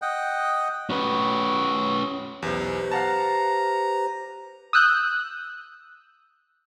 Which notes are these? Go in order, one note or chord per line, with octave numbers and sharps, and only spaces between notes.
D#5 F#5 G5
C#4 F#4 B4
B1 E2 G4 B4 C5
F5 F#5 A5 A#5
D#6 E6 F#6 G6